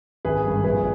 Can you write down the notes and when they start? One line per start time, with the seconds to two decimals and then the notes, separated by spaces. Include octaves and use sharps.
0.25 G#1 G#4 B4
0.44 G2 G3
0.64 A#1 G#4 B4